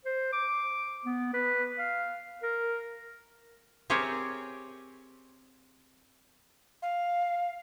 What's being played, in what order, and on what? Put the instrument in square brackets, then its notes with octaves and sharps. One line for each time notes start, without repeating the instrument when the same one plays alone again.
[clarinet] C5
D6
B3
B4
F5
A#4
[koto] C4 G4 G#4 A#4 C5 C#5
[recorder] F5